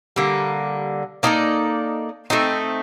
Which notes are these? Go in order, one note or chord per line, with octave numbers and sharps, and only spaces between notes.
D3 G3 A#3
A#3 D#4 A4 D5
A3 C4 D#4